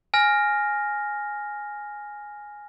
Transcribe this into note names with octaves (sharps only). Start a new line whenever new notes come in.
G#5 F6 A#6